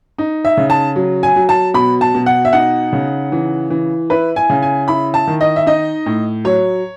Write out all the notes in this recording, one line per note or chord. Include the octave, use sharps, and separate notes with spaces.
D#4
E5
C#3
A5
F#3
G#5
F#3
A5
B2 B5
A5
B2
F#5
E5
D#4 F#5
C#3
E3
E3
E4 B4
G#5
C#3
G#5
E4 B5
A5
D#3
D#5
E5
D#4 D#5
A2
F#3 C#5